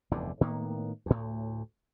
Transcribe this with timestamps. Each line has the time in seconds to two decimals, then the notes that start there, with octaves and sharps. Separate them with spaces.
0.11 F1 E2 G2 D3
0.41 A2 D#3 A#3 B3
1.06 D2 A2